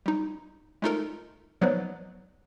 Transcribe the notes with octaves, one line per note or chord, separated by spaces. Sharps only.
G3 D#4
G#3 A3 D#4 F4 A4 A#4
F3 F#3 B3 D#4 B4 D5